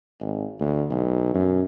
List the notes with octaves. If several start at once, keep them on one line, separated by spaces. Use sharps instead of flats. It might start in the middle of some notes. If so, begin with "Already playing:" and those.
G#1
D2
B1
F#2